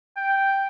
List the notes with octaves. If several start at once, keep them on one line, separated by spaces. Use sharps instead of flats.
G5